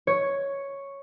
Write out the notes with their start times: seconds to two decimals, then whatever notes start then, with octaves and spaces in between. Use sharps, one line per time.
0.07 C#5